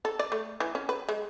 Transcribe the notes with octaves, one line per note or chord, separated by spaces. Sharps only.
A4
D5
A3
E3
C#4
B4
G#3